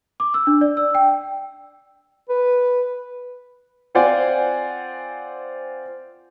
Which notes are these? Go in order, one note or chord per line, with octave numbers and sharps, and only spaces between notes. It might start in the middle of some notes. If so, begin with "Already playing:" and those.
D6
E6
D4
D5
E6
G5
B4
C4 F4 C5 D5 F#5 G#5